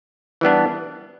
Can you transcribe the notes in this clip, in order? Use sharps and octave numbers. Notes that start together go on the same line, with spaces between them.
E3 G3 B3 D4